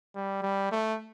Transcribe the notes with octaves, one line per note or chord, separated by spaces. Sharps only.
G3
G3
A3